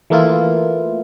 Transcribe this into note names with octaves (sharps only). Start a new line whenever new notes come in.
E3 A3 A#3 E4 F4